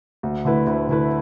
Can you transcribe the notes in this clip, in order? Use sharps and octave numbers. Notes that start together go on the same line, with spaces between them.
D2
D3 A3 E4 B4
D2
D3 A3 E4 B4